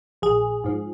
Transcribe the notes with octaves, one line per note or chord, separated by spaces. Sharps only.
A#1 G#4
G#2 F3